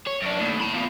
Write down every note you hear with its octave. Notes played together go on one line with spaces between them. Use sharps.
C#5
F#2 D4
D#2 A2
A5 B5
E2 F4